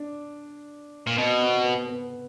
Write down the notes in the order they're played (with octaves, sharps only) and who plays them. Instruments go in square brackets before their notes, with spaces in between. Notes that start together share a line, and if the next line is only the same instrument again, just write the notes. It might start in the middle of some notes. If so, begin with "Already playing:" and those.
Already playing: [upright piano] D4
[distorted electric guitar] A#2
[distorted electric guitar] B2 [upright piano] C4
[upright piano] C4
B3
B3